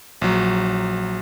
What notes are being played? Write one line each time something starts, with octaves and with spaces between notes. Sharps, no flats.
A#1 F#3